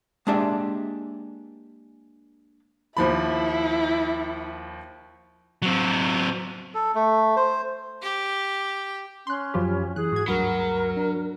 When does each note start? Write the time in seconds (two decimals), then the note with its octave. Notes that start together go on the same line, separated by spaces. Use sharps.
0.27 G#3 A#3 D4 G4 D5 E5
2.97 D#2 F3 E4 B5
5.62 F#3 C4
6.74 A4
6.95 A3
7.36 C5
8.02 G4
9.27 C#4 C6 F#6
9.54 F#2 F3 F#3 F4 G4 B5
9.96 E3 G#4 F#6
10.12 G#2 F#4 G#6
10.28 D2 G2 F#3 A#4 B5
10.97 D4